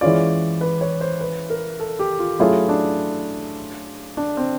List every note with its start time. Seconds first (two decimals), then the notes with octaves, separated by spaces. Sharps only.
0.01 E3 G#3 C#4 F4 D5
0.61 B4
0.81 C#5
1.01 C5
1.21 B4
1.50 A#4
1.80 A4
1.99 G4
2.19 F4
2.39 F#3 A3 C#4 E4 F4 G#4
2.69 D4
4.17 D4
4.37 C4